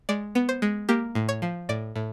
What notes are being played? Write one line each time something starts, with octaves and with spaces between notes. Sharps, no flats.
G#3 D5
B3
C5
G#3
A#3 G4
A2
C#5
F3
A2 D5
A2